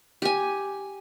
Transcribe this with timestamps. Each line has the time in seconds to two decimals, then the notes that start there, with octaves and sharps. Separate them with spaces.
0.22 G4 G#5